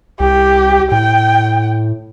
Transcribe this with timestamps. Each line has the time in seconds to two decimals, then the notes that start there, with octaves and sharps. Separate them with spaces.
0.20 C2 G4
0.92 A2 G5